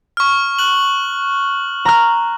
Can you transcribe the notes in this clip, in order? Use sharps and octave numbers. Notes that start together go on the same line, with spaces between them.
C#6 F6
F#6 F#7
A#5 F6